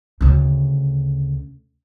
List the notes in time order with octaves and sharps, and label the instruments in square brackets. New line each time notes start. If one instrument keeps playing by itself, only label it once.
[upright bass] D2 C#3